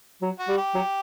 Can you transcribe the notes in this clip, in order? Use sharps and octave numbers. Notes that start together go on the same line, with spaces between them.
F#3
F#4
G3
G4
F#3